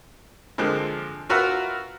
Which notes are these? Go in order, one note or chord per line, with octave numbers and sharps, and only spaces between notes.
D3 F3 G#3 A#3 C4
F4 F#4 A#4 B4 E5 F#5